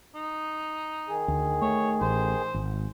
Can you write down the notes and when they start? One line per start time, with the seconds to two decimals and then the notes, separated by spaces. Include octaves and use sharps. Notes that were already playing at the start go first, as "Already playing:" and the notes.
0.15 D#4
1.09 D#3 G#4
1.28 D2
1.62 A3 C#5
2.01 A1 C5
2.54 G#1